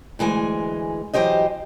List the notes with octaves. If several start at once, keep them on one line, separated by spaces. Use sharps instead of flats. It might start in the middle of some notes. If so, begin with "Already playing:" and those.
D2 E3 G#3 G#5
E3 F#3 G4 C5 D#5